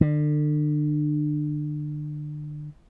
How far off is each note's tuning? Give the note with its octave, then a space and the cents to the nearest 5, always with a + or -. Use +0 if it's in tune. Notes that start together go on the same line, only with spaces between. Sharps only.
D3 +30